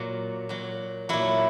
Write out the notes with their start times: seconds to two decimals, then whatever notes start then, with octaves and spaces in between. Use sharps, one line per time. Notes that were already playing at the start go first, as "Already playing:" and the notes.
Already playing: A#2 F#3
0.49 A#2 F#3
1.09 A#2 F#3 E4